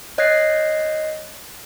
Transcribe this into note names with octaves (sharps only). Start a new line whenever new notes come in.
C#5 D#5 F#6 G#6 A#6 C7